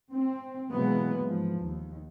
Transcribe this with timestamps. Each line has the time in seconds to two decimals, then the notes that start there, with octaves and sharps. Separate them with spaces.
0.13 C4
0.72 B2 E3 F#3 G#3 A#3 B3
1.23 G#2 F3
1.60 D#2